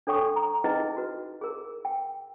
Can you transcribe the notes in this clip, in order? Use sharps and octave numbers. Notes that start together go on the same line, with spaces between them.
D4 A4 C#5 G5 C#6 D#6
A#5
D#4 E4 G#4 B4 D#5 G5
F#4 B4
G#4 A#4
G5